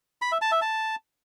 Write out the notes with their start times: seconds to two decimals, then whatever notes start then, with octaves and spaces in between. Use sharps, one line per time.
0.22 B5
0.32 E5
0.42 A5
0.52 E5
0.62 A5